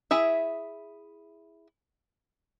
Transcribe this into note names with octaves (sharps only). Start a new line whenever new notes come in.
E4 G#4 E5